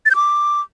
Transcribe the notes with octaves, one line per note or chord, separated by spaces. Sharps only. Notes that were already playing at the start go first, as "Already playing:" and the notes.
A6
G6
D6